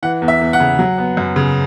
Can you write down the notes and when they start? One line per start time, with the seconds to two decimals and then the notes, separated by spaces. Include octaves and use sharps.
0.03 E3 F#5
0.22 E2
0.28 E5
0.41 E2
0.53 F#5
0.60 C#3
0.79 F#3
0.98 B3
1.17 F#2
1.36 C#3